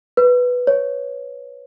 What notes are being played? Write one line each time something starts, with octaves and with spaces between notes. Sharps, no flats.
B4
C#5